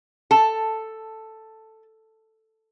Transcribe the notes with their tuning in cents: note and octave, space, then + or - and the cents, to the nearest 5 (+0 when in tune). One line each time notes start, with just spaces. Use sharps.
A4 +5 A5 +0